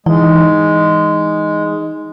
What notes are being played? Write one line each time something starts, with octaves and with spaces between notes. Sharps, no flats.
E3 G#3 D#4